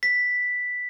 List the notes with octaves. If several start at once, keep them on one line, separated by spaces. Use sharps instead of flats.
B6